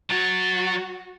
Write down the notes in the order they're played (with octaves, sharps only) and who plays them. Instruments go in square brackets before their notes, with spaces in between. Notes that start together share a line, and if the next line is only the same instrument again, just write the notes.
[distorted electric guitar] F#3 C#5 [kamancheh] F#4 [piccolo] A6